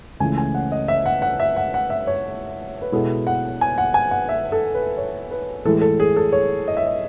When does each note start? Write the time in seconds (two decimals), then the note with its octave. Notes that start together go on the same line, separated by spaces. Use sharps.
0.20 C#2 C#3 E3 A3 G#5
0.38 G#5
0.54 F#5
0.72 D#5
0.88 E5
1.06 F#5
1.22 F#5
1.40 E5
1.56 F#5
1.74 F#5
1.90 E5
2.07 C#5
2.82 B4
2.92 B2 G#3 B3 E4 A4
3.27 F#5
3.61 G#5
3.78 F#5
3.94 G#5
4.11 F#5
4.29 E5
4.52 A4
4.75 B4
4.98 C#5
5.31 B4
5.65 A2 E3 G#3 A4
5.81 A4
6.00 G#4
6.17 A4
6.32 C#5
6.68 D#5
6.77 E5
6.86 D#5